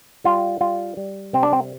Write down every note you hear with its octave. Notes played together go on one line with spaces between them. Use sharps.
G3 F4
G3 F4
G3
C3 C4
D4
C4